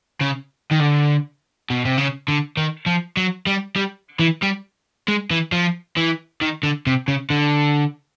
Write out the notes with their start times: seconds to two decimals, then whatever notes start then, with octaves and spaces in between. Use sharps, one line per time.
0.21 C#3
0.72 D#3
0.81 D3
1.70 B2
1.85 C3
1.98 C#3
2.28 D3
2.57 D#3
2.86 F3
3.17 F#3
3.47 G3
3.76 G3
4.19 E3
4.42 G3
5.08 G#3
5.31 E3
5.52 F3
5.97 E3
6.42 D#3
6.63 D3
6.87 C3
7.08 C#3
7.30 D3